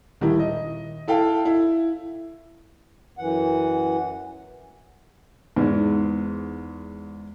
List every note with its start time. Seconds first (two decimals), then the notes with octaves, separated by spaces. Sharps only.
0.21 D#1 D#3 G3 E4
0.39 D#5
1.08 E4 A4 F5 G5
1.45 E4
3.18 F#2 E3 F#5
5.56 E2 G#2